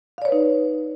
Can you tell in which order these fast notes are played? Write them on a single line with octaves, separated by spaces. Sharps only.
F5 D5 C#5 B4 D#4